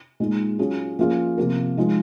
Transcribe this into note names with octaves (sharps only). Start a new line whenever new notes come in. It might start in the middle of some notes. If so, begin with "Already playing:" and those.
A#2 G#3 D#4
F#3 C#4 F4 G#4
F3 A#3 C#4 F4 G#4
C3 F3 A#3 F4 A#4
F3 G#3 D#4